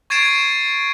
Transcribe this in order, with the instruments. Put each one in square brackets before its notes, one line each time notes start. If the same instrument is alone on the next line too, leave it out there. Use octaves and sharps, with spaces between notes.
[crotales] C#6 G#6 A6 C7 D7 E7